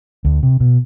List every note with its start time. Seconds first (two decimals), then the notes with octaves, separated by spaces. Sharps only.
0.25 D2
0.43 C3
0.60 B2